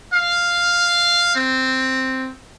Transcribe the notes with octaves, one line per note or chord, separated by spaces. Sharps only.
F5
C4